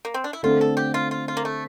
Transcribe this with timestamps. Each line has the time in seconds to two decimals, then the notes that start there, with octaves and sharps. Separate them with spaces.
0.05 A#3
0.14 C4
0.24 D4
0.33 E4
0.43 D3 A3 C4 F4
0.61 A4
0.77 G4
0.94 F4
1.11 F4
1.28 F4
1.37 A#3
1.45 A3